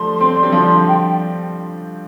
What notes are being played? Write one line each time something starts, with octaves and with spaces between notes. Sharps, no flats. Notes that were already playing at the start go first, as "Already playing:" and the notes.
Already playing: D3 F3 G3 A3 C6
C4
D4
G3 C4
F3
D3 G3
G5